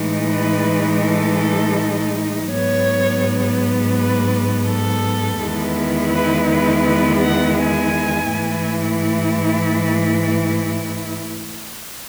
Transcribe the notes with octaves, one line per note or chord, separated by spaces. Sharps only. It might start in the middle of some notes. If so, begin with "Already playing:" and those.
Already playing: A2 E3 G#3 D#4
B4
A4
G#2 F#3 B3 C#5
B4
A4
E2 D#3 G#3 B3 E4
B4
B4
B4
F#5
G#5
G#2 E3 A3 E4